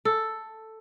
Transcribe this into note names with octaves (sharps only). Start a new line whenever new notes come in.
A4